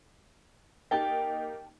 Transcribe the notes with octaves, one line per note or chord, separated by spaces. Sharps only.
A#3 D#4 G4 G5 A5